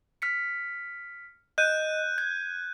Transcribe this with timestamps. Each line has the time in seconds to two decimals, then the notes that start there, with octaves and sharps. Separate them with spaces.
0.22 F6 B6 C#7
1.58 D#5 F#6 G6 D#7
2.18 G#6